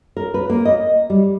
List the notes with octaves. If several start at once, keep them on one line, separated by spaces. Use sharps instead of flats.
A#4
B4
A#3
D#5
G3